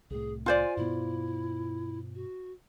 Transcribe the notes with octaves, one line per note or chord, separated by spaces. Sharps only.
C2 A2 G#4
F4 C5 D5 G#5
G2 B2 B3 E4
F#4